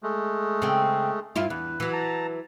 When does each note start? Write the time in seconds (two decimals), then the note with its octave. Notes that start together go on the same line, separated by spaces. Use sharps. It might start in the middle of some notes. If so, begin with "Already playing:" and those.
0.03 G#3 A3
0.62 C#3 C4
1.36 G2 E4 F4
1.50 E2 B4
1.80 E3 F#3
1.93 A5 A#5